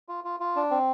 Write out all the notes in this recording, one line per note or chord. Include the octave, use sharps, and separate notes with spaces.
F4
F4
F4
D4
C4